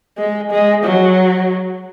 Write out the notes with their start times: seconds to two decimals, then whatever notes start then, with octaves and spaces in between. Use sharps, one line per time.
0.18 G#3
0.51 G#3
0.84 F#3